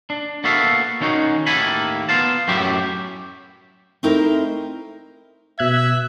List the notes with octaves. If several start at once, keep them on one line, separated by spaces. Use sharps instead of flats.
D4
A#3 B3 F#4 A4 E5 F5
D#3 C#4 D#4 F#4
D#2 A2 A#3 A4 G#5 B5
B3 F4 F5 A5
F#2 A2 F#3 C#4 G4 E5
A3 C4 D#4 E4 A#4 C5
B2 E5 F#6 G#6